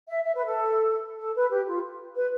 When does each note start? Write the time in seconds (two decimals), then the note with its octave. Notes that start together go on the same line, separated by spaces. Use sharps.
0.08 E5
0.24 E5
0.35 B4
0.46 A4
1.19 A4
1.35 B4
1.51 G4
1.67 F4
2.15 B4